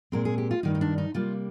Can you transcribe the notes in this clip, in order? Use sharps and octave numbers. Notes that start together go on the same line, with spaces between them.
A#2 G#3 C4 A#4
G#4
G4
F4
G2 D#3 G3 D#4
D#4
D4
D#4
C3 G3 A#3 F4